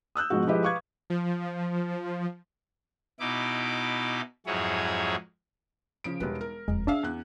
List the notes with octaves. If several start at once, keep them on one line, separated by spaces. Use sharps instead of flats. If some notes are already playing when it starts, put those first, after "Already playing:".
D#6 E6 F#6 G6
G#2 B2 F3 G#3 F#4
F3 G#3 E4 G4 B4 D#5
B4 F5 C#6 D6 F#6 G#6
F3
B2 D#4 E4 D6
F2 G#2 F#3 E4 G#4 C#5
C#3 F3 D7
E1 G3 D#4 B4
A#4
E1 F2 G#3
C#4 D4 G#4 E5 F5 E6
E2 F#6